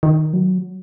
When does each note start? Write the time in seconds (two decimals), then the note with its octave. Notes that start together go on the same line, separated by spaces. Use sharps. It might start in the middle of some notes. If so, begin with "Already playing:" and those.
0.03 D#3
0.33 F#3